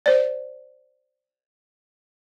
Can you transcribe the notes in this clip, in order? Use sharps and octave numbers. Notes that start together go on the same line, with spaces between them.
C5 D5